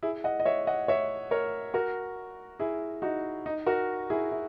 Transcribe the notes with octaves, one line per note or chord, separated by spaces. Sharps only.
E4 G#4
D#5 F#5
D#5
C#5 E5
D#5 F#5
C#5 E5
A#4 C#5
F#4 A#4
E4 G#4
D#4 F#4
D#4
F#4 A#4
E4 G#4
E4